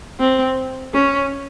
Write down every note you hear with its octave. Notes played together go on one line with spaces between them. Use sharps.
C4
C#4